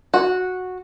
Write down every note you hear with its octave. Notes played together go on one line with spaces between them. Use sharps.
F#4